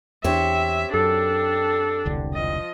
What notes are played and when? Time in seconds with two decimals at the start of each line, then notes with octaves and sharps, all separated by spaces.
0.24 E2 C4 D4 G4 C#5 E5
0.93 F#2 D4 A4
2.05 E1 C2 D3
2.34 F3 D#5